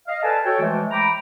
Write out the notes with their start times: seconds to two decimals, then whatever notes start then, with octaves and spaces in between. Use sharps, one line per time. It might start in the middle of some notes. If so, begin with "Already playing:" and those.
0.07 D#5 F5
0.22 A4 B4 D5 D#5 G#5 A5
0.44 F#4 A4 C#5 G5
0.60 E3 F3 G#3 A3
0.91 G5 A#5 B5 D6